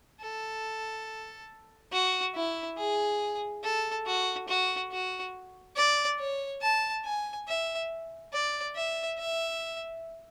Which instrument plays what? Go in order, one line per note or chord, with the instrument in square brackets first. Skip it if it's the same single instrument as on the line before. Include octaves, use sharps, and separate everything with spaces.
[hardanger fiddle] A4
F#4
E4
G#4
A4
F#4
F#4
F#4
D5
C#5
A5
G#5
E5
D5
E5
E5